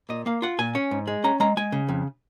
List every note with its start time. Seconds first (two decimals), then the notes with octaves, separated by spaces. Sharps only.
0.09 A#2 D#5
0.26 A#3 F5
0.42 F4 F#5
0.59 A#2 G#5
0.75 C#4
0.91 G#2
1.07 G#3
1.24 C#4 A#5
1.40 G#3 A#5
1.57 G#3 G#5
1.72 C#3
1.89 F2